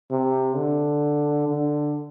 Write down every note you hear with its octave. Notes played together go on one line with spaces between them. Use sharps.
C3
D3
D3